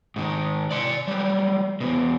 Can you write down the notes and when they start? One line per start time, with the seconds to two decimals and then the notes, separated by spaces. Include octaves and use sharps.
0.16 G#2 D#3
0.71 D5 C6
1.07 F#3 G3
1.80 E2 B2